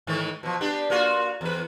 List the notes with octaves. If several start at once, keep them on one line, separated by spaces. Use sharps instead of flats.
G#2 D#3 E3
B2 F3
B3 D4 G4
A#3 F4 F#4
E2 B4